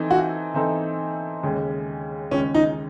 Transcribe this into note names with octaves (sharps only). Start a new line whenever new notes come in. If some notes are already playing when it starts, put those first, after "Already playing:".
Already playing: E3 C4 D#4 A4
F#4
E3 C4 D#4 A4
D#2 C#3 G#3
D#2 C#3 G#3 C#4
D#4